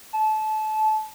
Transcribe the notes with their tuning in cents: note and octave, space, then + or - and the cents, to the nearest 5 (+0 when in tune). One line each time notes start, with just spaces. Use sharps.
A5 -25